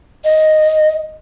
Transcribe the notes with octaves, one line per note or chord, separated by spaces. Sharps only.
D#5